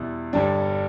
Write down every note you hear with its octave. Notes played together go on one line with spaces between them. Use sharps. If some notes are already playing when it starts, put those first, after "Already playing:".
Already playing: E2 B2 G3 E4
G1 G2 G3 D4